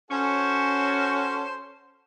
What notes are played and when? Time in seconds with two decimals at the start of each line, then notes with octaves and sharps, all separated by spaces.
0.11 C#4 F#4 A4 C5